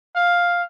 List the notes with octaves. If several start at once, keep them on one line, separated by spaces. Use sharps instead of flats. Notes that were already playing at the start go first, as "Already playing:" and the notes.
F5